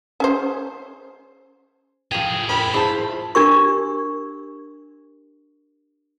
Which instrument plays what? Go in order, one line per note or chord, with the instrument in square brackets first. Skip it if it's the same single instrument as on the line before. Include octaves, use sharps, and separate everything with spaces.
[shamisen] C#4 G#4 C5
[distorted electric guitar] A2 G#4 [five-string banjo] F3 G4
[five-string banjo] G4 A#4 C5 [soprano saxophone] B5
[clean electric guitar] E4 C5 A5 [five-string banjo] F4 G#4
[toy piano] D4 G4 A#4 C#6